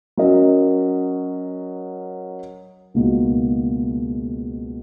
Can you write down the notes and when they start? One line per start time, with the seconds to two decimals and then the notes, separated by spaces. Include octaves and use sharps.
0.17 F#3 C#4 F#4 A#4 D#5
2.94 C#2 B2 A#3 D#4 F#4